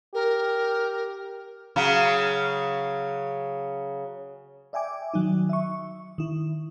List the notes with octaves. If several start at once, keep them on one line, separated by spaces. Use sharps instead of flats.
G4 A#4
C#3 F#3
D5 E5 G5 G#5 D6
D#3 F#3 D#4
E5 C#6
D#3 E4